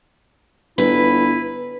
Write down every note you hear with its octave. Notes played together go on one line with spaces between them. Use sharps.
G1 E4 B4